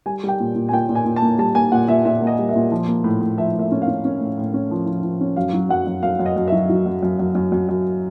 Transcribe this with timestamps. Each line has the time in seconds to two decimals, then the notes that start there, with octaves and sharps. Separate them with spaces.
0.06 G3 G#5
0.24 G3 G5
0.40 A#2
0.56 A#2
0.69 G#5
0.72 A#2 G5
0.89 A#2
0.95 G#5
1.05 A#2
1.16 A5
1.22 A#3
1.38 G3 A5
1.55 A#3 G#5
1.72 A#2 F#5
1.88 A#2 E5
2.05 A#2 E5
2.22 A#3 D#5
2.39 G3
2.49 E5
2.56 A#2
2.72 F3
2.88 A#3
3.04 A2
3.21 A2
3.38 F3 E5
3.54 A2
3.59 E5
3.72 C#4
3.82 F5
3.88 C#4
4.04 C#4
4.20 A2
4.38 A2
4.54 C#4
4.71 F3
4.86 F3
5.03 F3
5.21 C#4
5.36 F#2 F5
5.53 F#3
5.69 F#2 F#5
5.86 F#2
6.03 F#2 F5
6.19 F#2
6.26 D#5
6.36 F#2
6.48 F#3 E5
6.70 F#3
6.86 F#2
7.03 F#2
7.19 F#2
7.35 F#2
7.52 F#2
7.69 F#2